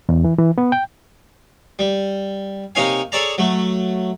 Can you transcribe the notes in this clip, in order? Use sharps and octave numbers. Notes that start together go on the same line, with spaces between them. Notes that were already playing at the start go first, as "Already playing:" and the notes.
E2
E3
E3
B3
G5
G3
C3 A#3 D#4 C#5 F5 G#5
G#4 A4 C#5 D5 A5 A#5
F#3 A3